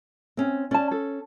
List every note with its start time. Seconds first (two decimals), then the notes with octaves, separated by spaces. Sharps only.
0.37 C4 C#4
0.71 C#4 D5 A5
0.91 A4